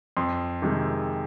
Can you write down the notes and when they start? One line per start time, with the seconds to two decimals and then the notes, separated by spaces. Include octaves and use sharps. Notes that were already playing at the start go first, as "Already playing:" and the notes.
0.17 F2 C6
0.62 C3 D#3 G#3